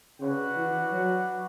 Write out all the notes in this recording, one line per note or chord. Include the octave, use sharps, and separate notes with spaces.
C#3 D4 F#4 B4 F#5
E3
F#3